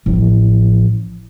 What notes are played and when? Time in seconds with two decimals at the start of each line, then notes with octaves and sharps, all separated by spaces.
0.06 A1 F3